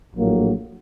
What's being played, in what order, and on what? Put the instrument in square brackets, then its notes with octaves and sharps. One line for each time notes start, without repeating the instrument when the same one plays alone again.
[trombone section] A#1 A2 F#3 A#3